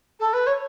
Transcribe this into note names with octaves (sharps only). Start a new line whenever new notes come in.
A4
B4
C#5